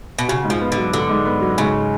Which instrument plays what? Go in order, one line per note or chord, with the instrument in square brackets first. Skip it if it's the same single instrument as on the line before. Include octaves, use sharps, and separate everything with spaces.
[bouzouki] B2
[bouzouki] C#3 [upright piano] F#4
[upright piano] G#2
[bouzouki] F3
[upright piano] B3
[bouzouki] D3
[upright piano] F#3
[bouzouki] D3 [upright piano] F#4
[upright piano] G#2
B3
F#3
[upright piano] G#2 [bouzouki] C#3